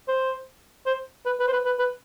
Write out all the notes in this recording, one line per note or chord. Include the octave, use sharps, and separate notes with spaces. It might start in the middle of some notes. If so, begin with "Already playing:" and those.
C5
C5
B4
B4
C5
B4
B4
B4